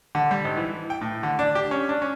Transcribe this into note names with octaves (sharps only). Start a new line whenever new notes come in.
D3
G3
G#1
E3
G5
A2
D3
D4
G4
C#4
D4
C#4